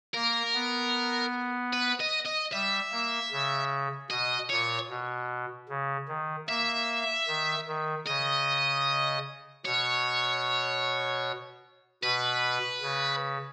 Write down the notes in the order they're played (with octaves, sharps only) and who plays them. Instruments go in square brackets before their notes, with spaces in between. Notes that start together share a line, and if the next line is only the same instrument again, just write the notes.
[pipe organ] A#3 [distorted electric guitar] A#4
[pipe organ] B3
[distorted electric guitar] B4
D#5
D#5
[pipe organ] G3 [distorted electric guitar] E5
[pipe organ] A#3
C#3
[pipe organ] B2 [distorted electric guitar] D#5
[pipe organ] A#2 [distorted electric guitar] C#5
[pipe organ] B2
C#3
D#3
[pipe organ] A#3 [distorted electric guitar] E5
[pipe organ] D#3
D#3
[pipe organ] C#3 [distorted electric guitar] D#5
[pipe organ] B2 [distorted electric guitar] C#5
[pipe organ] B2 [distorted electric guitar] B4
[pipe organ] C#3